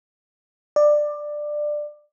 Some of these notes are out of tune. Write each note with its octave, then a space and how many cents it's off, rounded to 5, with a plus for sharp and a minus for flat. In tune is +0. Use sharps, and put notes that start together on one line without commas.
D5 +15